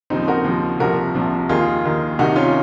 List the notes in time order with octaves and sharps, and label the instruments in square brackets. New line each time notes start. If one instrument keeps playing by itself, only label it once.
[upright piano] D#2 C#3 F3 C4 D#4
F#4 A#4
D#2 C#3 F3
C2 C3 F3 F#4 A#4
C2 C3 F3
D#2 D#3 F4 G#4
D#2 D#3
C2 C3 D#3 D#4 F#4
C#4 F4